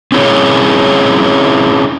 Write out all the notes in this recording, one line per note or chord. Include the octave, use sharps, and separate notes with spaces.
C4 C#4 E4 G#4 C#5